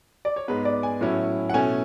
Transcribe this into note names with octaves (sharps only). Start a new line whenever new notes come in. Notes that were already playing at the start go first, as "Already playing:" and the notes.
D5
C#5
G#2 G#3 B3 B4
D5
G#5
A2 F#3 C#4 E4
F#5
B2 A3 C#4 E4 G#5